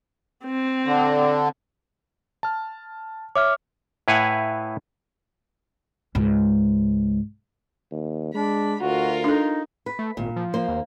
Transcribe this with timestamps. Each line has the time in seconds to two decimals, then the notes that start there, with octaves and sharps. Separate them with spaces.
0.45 C4
0.86 D3
2.43 A5 F6
3.36 C#5 E5 D6 F6
4.08 A2 E4 B4 F5 F#5 G#5
6.15 C#2 G#2
7.91 D#2
8.34 G#3 D4 B5
8.81 D2 F4 F#4 A#4
9.24 D4 D#4 A4
9.86 B4
9.99 A3
10.17 G#1 A#2
10.36 F3
10.54 A#3 C5
10.68 D#2